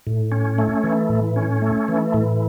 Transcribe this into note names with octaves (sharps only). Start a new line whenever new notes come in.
A2
C#4
A3
E3
A2
C#4
A3
E3
A2